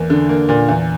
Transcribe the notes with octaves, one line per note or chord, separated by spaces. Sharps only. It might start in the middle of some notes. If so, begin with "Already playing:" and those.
Already playing: E2 A#3
D3
A#3
A#2
E2